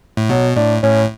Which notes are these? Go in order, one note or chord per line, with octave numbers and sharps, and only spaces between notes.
A2
B2 F#3
A2 D4
A2 C#4